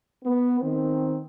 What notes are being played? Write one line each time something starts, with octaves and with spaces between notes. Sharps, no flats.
B3
D#3 C4